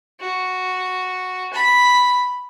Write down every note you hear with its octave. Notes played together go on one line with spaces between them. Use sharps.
F#4
B5